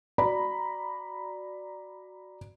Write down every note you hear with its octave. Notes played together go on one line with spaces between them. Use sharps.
F#4 D5 A#5 B5